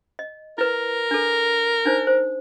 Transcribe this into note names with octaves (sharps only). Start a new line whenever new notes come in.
D#5
E4 A#4 B4
D4 A4
D4 D#4 C5
C5